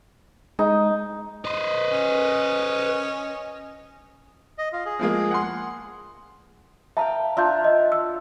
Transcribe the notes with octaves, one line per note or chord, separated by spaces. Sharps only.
G#3 D#4
B4 C5 D#5
C#4
D#5
F4
G#4
F3 G#3 A#3
F#5 C6
B4 E5 F5 G5 A5 A#5
D4 F4 E5 F5 G6
D#5
E6